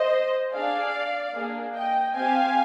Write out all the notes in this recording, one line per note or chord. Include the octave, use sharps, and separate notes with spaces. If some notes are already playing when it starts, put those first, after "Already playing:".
Already playing: C5 D#5
D4 G#4 D5 F5
A#3 D4 G#4
D#5 G5
C4 G4 F5 G#5